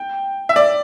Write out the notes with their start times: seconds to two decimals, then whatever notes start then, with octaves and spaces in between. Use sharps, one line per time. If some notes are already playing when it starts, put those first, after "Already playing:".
Already playing: G5
0.49 E5
0.56 D5